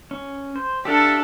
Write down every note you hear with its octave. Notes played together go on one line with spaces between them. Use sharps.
C#4
C5
D4 G4 A4 E5 F5